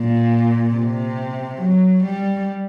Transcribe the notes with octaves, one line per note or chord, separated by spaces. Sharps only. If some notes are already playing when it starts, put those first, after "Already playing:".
Already playing: A#2
C3
F#3
G3